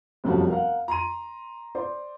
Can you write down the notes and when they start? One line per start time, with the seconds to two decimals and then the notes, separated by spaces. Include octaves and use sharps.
0.24 F1 B1 F#2 F3 G3 F#4
0.49 A#4 F5 F#5
0.88 A#5 C6 D#7
1.75 C5 D5 C6